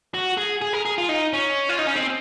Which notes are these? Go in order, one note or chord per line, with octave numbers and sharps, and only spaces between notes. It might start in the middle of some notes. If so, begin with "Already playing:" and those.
F#4
G#4
G#4
A#4
G#4
F4
D#4
C#4
F4
D#4
C#4
C4